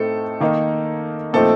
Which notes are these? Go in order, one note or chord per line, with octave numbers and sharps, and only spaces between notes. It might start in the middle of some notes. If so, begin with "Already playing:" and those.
Already playing: A2 A3 C4 D#4 A4
D#3 A#3 D#4
A#2 F3 A3 C4 D#4 A4